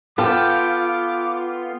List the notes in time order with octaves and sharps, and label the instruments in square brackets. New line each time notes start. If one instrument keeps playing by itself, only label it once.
[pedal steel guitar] B3 F4 [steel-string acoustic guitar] A4 G5 [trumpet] D6